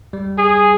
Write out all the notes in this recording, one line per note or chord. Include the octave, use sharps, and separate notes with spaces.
G3
G#4